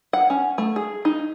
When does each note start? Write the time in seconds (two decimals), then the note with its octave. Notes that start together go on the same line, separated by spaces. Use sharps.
0.13 F#5
0.30 C#4
0.58 A3
0.76 G#4
1.05 D#4